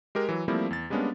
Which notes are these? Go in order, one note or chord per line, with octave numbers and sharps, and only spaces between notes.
G#3 G4 A#4
E3 F#3
F3 G3 A3 A#3 C4 E4
E2 A6
G3 G#3 A#3 B3 C#4 D4